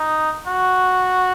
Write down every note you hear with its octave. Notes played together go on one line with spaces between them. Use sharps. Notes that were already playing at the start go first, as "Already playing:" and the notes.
Already playing: D#4
F#4